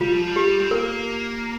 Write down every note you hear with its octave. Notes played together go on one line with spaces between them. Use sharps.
G3 F4
F3
G3
G4
C4
A#3 A#4